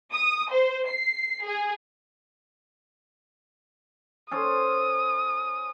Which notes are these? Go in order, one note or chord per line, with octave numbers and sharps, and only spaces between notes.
D#6
C5
C7
G#4
C#4 A4 C5 D#6